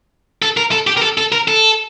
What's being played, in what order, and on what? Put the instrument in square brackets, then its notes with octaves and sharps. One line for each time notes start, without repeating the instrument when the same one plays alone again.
[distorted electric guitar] A4
A#4
A4
G4
A#4
A4
A4
A#4
A4